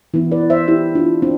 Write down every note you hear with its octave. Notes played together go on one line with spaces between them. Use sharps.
E3 B3 E4
B4 D5
C5 E5
E4 G4
D4 F4
C4 D4